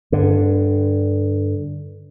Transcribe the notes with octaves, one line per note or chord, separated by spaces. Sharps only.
G2 D3